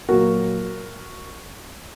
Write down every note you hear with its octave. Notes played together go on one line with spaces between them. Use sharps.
A#2 F#3 A#3 F#4 A#4